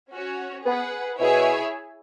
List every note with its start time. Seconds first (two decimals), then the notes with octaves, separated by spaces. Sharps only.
0.11 C#4 F#4 C#5
0.64 B3 G#4 B4 F#5
1.19 B2 E4 G#4 C#5 E5 G#5